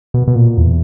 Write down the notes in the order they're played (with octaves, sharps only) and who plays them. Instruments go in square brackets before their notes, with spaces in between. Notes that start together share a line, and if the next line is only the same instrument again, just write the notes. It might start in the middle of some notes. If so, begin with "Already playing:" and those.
[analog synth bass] B2
B2
A#2
E2